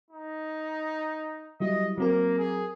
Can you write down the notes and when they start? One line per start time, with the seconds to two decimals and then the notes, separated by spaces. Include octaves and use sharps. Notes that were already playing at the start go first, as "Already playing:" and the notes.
0.11 D#4
1.60 F#3 G3 E4 D#5
1.98 F#3 A#3 C4 A#4
2.38 G#4